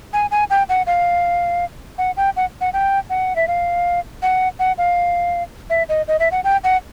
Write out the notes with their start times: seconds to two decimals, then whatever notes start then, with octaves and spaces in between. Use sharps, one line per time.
0.13 G#5
0.31 G#5
0.50 G5
0.69 F#5
0.87 F5
1.98 F#5
2.17 G5
2.37 F#5
2.61 F#5
2.73 G5
3.10 F#5
3.36 E5
3.48 F5
4.22 F#5
4.59 F#5
4.78 F5
5.70 E5
5.89 D#5
6.08 D#5
6.20 E5
6.32 F#5
6.44 G5
6.64 F#5